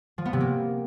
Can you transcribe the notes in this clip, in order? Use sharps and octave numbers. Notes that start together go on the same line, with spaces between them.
F3
B3
C3
A#3